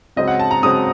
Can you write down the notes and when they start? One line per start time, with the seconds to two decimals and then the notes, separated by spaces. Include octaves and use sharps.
0.16 C#2 C#3 F#3 C4 D#5
0.28 F#5
0.39 A5
0.51 A#5
0.62 C#2 C#3 F#3 C4 D#6